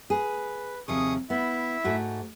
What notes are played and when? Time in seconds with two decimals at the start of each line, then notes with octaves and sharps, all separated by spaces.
0.10 G#4 B4
0.88 D#2 C3 F3 G#4 C#6 D#6
1.30 B3 E4 E5
1.84 G#2 A3 F#4